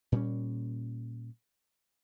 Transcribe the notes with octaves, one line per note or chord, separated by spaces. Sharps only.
A#2 G3 C#4